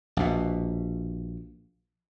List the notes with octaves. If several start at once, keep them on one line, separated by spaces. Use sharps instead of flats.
A#1 B2